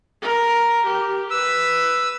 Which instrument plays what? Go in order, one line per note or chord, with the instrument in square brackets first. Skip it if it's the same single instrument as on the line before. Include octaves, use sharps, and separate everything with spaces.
[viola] A#4
G4
[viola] B4 [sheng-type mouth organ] E6